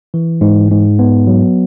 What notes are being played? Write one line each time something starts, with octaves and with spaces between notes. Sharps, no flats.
E3
G#2
G#2
B3
F#3